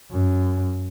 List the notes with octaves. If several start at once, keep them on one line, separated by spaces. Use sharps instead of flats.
F#2